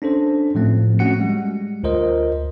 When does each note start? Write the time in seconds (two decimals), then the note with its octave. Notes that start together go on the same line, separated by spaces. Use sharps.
0.02 C#4 D4 A4 C5
0.55 A2 F3 A3 C4
0.99 A3 C#4 F#4 F#5 C#7
1.19 G3 G#3
1.83 D2 F4 A#4 C5 D#5